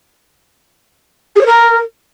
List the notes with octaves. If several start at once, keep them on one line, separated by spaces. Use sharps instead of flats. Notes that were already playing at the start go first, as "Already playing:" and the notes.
G#4
C#5
A#4